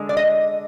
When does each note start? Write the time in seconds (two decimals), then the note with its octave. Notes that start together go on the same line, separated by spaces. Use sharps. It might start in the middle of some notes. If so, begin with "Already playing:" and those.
Already playing: D3 G#3
0.09 D5
0.17 D#5